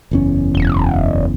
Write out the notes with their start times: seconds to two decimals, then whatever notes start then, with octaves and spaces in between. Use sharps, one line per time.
0.11 F#1 E2 C#4
0.54 E1